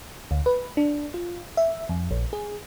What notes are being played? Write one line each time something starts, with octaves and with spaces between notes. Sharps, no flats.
D2
B4
D4
F4
E5
F2
A#1
G#4